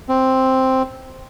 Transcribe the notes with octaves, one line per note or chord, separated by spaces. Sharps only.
C4